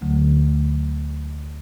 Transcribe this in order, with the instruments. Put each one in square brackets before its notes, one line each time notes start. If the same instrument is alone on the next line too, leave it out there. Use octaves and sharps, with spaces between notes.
[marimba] D2 D3 F#3 A3